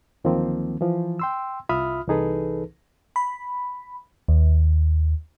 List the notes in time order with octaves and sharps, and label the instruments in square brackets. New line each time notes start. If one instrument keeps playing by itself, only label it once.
[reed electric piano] D2 D#3 F3 F#3 A#3 C4
E3 F3
G5 C6 E6
C2 F4 E5 B5 D#6 F6
C2 E3 D#4 G#4 A4 B4
[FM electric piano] B5
D#2